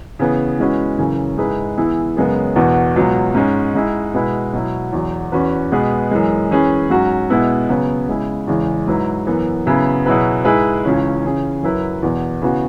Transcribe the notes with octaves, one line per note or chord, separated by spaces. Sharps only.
C#3 E3 B3 G#4
E3 G#3 C#4 F#4 B4
F#2 C#3 E3 C#4
G#2 G#3 E4 G#4 B4
E3 B3 E4 G#4
F#2 C#3 G#3 B3
E2 B2 B3 F#4
C#2 B2 F#3 B3
G#2 G#3 C#4
G#2 G#3 E4
B2 G#3 E4 B4
B2 F#3 E4
E2 B2 F#3
E2 E3 C#4 F#4 B4
B2 G#3 B3 G#4 B4
F#2 E3 G#3
E3 C#4 G#4 B4
G#2 F#3 C#4 F#4
B2 G#3 B3 E4
C#3 F#3 B3
C#3 G#3 E4
E2 C#3 E3 G#3 C#4
G#2 F#3 E4 B4
F#2 E3 B3
C#3 F#3 B3 E4 B4
B2 F#3 E4 G#4 B4
G#2 G#3 E4 G#4 B4
C#2 C#3 E3 C#4
C#3 E3 C#4 G#4
F#2 F#3 E4 B4
E2 B2 B3
C#3 E3 B3 F#4